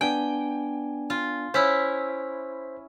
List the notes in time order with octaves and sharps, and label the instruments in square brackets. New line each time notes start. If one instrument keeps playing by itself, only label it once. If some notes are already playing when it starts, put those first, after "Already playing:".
[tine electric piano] B3 D4 G#5 [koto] G5
[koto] F4
[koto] C#4 E4 [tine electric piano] C5 B6